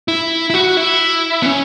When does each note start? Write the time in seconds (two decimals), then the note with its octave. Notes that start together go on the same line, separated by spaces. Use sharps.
0.08 E4
0.50 E4
0.54 F#4
0.77 E4
1.43 B3
1.46 C#4